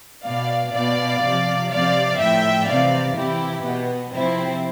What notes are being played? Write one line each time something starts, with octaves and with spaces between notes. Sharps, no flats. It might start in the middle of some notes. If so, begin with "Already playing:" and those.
B2 D5 F5
B2 D5 F5
C3 F3
C3 F3 D5 F5
A2 F3 E5 G5
C3 E3 D5 F5
C3 E3 E4 G4
B2 B3
C3 F3 C4 E4